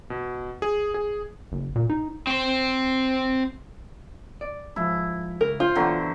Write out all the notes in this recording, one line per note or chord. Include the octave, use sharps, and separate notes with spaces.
B2
G#4
G#4
F#1
A#2
D#4
C4 C5
D5
G#2 F3 E4
C#2 A#4
F4 C5
B2 D3 E3 F#3 B3 G4